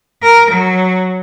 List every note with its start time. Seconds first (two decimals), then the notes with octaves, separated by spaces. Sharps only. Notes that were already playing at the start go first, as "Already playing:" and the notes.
0.22 A#4
0.51 F#3